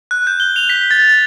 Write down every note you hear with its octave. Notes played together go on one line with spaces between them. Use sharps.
F#6
G6
G7
F7
B6
A6
A6